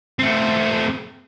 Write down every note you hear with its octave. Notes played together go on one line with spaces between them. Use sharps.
A3 C4